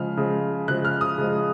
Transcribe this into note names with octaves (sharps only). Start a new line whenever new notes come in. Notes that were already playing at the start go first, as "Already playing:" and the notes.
Already playing: C#3 F3 G#3 F6
C#3 F3 G#3
C#3 F3 G#3 F#6
F6
D#6
C#3 F3 G#3